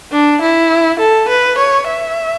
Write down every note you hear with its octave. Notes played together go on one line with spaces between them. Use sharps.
D4
E4
A4
B4
C#5
E5